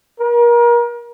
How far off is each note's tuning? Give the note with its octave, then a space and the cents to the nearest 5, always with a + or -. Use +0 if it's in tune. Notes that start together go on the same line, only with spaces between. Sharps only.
A#4 +35